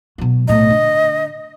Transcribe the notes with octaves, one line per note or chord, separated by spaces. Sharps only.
B2 F#3
B1 A2 D#5
D3